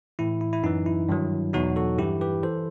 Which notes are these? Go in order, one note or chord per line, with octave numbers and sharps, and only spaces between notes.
A2 E3 E4
E4
E4
F#2 E3 D#4
E4
G2 D#3 F#3
E2 B2 F#3 D#4 F#4
F#4 A4
G2 E3 E4 G4
G4 B4
E3 A4 C5